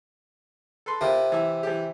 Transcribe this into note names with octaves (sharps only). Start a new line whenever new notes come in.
A4 B4 C6
C3 F4 A#4 B4
E3 E5
E3 G4